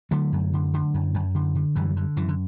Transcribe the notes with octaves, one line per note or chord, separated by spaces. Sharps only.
D3 F#3 A3
F#2
D3
D3
F#2
F#2
D3
D3
F#2 E3 G3
D3
F#2 E3
D3